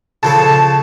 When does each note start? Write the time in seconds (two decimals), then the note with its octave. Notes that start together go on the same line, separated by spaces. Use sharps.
0.23 C#3 F3 A4 A5